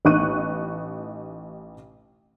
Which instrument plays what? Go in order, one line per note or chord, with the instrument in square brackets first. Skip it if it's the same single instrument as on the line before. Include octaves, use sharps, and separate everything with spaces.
[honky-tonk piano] A1 D#4 C#6 F#6 D#7